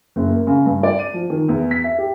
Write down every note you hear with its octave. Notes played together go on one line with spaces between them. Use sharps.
F#1
A#3
C#3
G2
D5
D#7
F3
D#3
E2
B6
E5
G4